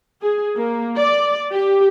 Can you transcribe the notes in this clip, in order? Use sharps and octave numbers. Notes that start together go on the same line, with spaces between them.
G#4
A#3
D5
G4